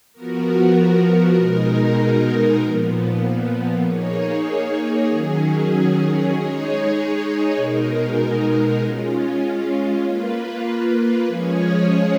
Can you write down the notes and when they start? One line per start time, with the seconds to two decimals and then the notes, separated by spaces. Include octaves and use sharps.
0.13 F3 B3 F#4 A#4
1.37 B2 G#3 D#4 A#4
2.61 A#2 F3 B3
3.84 A#3 D#4 G#4 C#5
5.08 D#3 F#3 C#4 G#4
6.32 G#3 D#4 G#4 C#5
7.56 B2 G#3 D#4 A#4
8.80 G#3 C#4 F4
10.04 A#3 F4 B4
11.27 F3 G#3 C#4 G#4 C#5